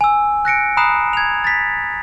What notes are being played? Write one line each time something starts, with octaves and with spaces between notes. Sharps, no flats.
G#5 E6
F#6 A#6 C#7 D7
A#5 B5 D#6 F#6 C7 E7
G#6 F7
A6 B6